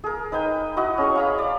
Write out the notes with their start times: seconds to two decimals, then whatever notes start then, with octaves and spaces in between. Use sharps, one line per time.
0.04 G#4 A#4
0.32 D#4 B4 D#5 G5
0.77 E4 F#4 D#5 F#5
0.98 C#4 G#4 C#6
1.15 F5 A#5 B5
1.38 D5